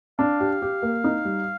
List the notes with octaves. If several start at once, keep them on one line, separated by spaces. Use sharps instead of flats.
D4 F5
G4
G4
A#3
D#4
G3